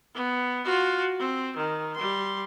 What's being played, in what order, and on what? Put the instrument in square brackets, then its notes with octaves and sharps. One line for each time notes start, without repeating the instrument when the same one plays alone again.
[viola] B3
F4 F#4
C4
D#3
G3 C6